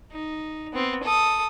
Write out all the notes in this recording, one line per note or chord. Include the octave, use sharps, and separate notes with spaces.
D#4
B3 C4
A4 D#6